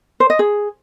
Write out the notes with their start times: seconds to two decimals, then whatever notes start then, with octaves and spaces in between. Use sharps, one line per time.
0.20 C5
0.30 D#5
0.39 G#4